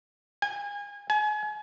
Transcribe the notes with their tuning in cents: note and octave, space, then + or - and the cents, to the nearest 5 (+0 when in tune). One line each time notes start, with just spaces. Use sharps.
G#5 -30
G#5 +35